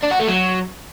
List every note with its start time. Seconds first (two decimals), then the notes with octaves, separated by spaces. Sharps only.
0.03 D4
0.11 F#4
0.19 A3
0.28 F#3